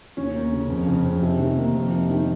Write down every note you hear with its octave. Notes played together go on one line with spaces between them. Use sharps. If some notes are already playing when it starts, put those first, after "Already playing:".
D#2 C#4
A#3
C#3
F2
C#3
F2
C3
D#3
A#3
F2
C3
D#3